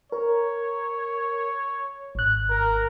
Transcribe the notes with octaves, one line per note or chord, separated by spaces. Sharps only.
A#4 C#5
G#1 F#6
A#4